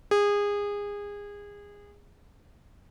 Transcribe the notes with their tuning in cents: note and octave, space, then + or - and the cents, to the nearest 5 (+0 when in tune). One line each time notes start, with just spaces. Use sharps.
G#4 -25